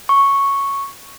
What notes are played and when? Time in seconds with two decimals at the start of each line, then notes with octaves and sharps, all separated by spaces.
0.09 C#6